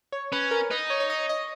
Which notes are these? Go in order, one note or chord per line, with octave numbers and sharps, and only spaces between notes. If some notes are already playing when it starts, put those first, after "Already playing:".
C#5
C#4 B4
A#4
D#4 B4
C#5
C#5
D#5
D#5